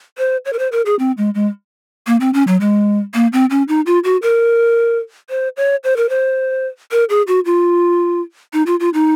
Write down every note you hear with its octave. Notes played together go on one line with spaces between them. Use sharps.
C5
C#5
A#4
C5
A#4
G#4
C4
G#3
G#3
A#3
C4
C#4
F#3
G#3
A#3
C4
C#4
D#4
F4
F#4
A#4
C5
C#5
C5
A#4
C5
A#4
G#4
F#4
F4
D#4
F4
F4
D#4